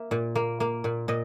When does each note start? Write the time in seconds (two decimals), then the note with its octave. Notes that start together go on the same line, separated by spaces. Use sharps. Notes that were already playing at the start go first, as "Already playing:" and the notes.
Already playing: A#3 E5
0.11 A#2
0.35 A#3
0.60 A#3
0.84 A#2
1.08 A#2 D#5